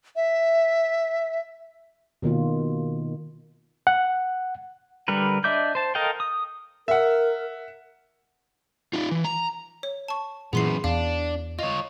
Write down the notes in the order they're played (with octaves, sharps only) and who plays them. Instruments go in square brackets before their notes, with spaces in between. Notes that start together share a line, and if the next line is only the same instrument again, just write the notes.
[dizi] E5
[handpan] B2 D#3 A#3 F4
[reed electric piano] F#5
[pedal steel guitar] D3 G3 A#4 B4
D4 D#5 E5 D6 G6
C5 A5
A4 A#4 D#5 F5 G5
D#6
[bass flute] A#4 [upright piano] E5 F#5
[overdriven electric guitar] D#4 F4
E3
A#5
[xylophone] C#5
A5 C#6
[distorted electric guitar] F#2 B3 [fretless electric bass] A#2 E3 [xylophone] G#4 C6 C7
[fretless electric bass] E2 [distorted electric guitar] D4 [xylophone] F5
[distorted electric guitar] F4 C#5 [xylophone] D#5